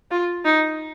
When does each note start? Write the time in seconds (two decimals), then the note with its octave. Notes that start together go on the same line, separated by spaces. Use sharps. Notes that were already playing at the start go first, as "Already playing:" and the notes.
0.11 F4
0.45 D#4